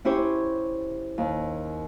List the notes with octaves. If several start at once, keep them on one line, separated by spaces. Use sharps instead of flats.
C#4 E4 G4 C5 C#5
D#2